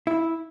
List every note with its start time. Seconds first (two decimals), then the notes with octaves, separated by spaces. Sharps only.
0.07 E4